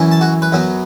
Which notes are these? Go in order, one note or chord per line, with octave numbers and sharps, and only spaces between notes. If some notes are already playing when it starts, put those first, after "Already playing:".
Already playing: F#2 E3 C#4
A5
F#4
B4
F#2 F#3 B3